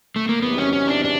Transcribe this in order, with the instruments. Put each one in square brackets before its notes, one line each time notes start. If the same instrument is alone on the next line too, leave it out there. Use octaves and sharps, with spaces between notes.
[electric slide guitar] A3
A#3
[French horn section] E2 C3 D#3 F#3 [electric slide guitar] B3
[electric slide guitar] C#4
C#4
D4
D4